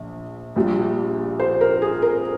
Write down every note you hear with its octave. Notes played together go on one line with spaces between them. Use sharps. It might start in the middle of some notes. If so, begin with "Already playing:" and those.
Already playing: A#1
A#1 A#2 G3
C5
A#4
G#4
A#4